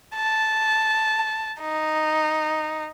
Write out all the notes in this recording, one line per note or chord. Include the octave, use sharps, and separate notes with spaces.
A5
D#4